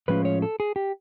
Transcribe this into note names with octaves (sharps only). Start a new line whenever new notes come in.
A2 F3 G#3 C#4 F4 B4
C#5
A4
G#4
G4